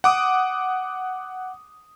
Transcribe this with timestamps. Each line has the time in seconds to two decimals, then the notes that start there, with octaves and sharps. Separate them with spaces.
0.04 F#5 D6 D#6